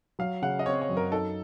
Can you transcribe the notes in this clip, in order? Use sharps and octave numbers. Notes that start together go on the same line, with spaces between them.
F#3 F5
C#3 F#5
D#5
C4 C#5
C#5
F#2
A#4
D#4 A4